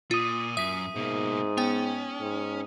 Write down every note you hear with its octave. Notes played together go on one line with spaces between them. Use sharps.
A#2 F4 D#6 D#7
F#2 E5 D#6 B6
G#2 B2 A#3
B3 C#4 G5
G#2